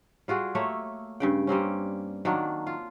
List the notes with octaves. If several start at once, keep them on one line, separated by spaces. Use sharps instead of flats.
G3 F4 F#4 G#4
A3 A#3 C#5 E5
G2 C#3 G5
G3 A#3 C4 C#4
D#3 F#3 A#3 D4
F4